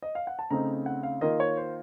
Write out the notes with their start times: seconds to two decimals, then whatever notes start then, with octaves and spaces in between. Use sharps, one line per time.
0.02 D#5
0.15 F5
0.27 F#5
0.39 A5
0.51 C#3 A3 C4 D#4 A#5
0.86 F#5
1.03 F5
1.21 D#3 A#3 F4 D#5
1.40 C#5
1.57 C5